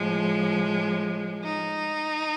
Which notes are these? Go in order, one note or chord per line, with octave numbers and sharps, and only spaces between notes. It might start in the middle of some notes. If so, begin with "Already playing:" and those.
Already playing: A2 F3 G#3
D#4